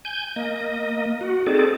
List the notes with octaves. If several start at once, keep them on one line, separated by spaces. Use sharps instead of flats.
G#5 G6
A#3 D#5
F#4
C4 D#4 G#4 A4 D5